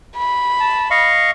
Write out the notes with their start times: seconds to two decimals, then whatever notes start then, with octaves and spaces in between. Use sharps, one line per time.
0.17 B5
0.60 A5
0.91 D#5 F5 C#6